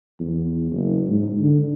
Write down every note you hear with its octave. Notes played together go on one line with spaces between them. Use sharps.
E2
F#1
G#2
D3